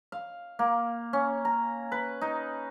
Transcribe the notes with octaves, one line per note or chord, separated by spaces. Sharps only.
F5
A#3
C#4
A#5
B4
D#4